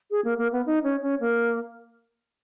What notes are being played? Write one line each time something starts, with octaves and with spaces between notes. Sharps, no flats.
G#4
A#3
A#3
B3
D#4
C#4
C#4
A#3